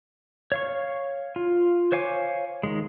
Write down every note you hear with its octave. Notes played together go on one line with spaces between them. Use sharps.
C#5 F5 C#6
F4
C5 C#5 F5 G#5 D6
D#3 G#3